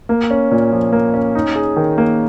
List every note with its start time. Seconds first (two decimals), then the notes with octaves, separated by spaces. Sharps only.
0.09 A#3
0.30 C#4
0.51 A#2
0.72 F3
0.92 A#3
1.14 C#4
1.35 D#4
1.55 G#4
1.76 D#3
1.98 A#3